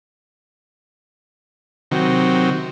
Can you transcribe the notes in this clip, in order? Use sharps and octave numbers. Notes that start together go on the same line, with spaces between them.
C3 D#3 F#3